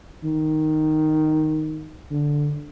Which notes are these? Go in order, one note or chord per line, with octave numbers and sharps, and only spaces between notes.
D#3
D3